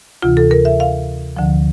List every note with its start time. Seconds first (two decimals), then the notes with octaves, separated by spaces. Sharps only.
0.22 D2 C3 E3 F4
0.37 A4
0.51 A#4
0.65 E5
0.80 F5
1.37 D2 D3 F3